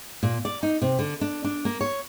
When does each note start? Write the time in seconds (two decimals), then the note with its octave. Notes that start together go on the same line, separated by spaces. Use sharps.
0.23 A#2
0.45 D5
0.63 D#4
0.82 C3
0.99 D3
1.21 D4
1.44 D4
1.65 A#3
1.81 C#5